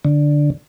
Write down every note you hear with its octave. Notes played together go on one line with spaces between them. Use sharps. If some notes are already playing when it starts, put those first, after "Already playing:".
D3